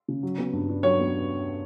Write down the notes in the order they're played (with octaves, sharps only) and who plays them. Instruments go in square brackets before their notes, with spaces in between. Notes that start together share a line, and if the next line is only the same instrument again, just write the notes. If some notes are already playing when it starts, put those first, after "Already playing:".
[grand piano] C#3
F#3
B3
G2
D4
[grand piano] F#3 [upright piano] C#5
[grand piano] B3